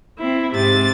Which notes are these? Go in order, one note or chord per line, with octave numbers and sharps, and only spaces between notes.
C4 E4
G#2 C3 A6